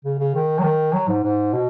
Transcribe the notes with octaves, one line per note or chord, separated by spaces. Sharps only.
C#3
C#3
D#3
F#3
D#3
F#3
G#2
G#2
B2